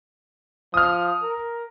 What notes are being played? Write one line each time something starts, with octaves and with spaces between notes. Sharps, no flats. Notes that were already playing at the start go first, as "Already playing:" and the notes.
F3 D#6 F6
A#4